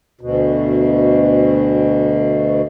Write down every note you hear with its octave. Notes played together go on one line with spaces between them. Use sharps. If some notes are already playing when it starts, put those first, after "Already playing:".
D2 B2